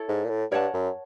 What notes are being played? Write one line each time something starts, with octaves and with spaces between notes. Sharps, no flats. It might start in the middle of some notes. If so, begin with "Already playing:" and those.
Already playing: E4 A4 C#5
G#2
A#2
A2
G2 A#4 C#5 F#5 A5
F#2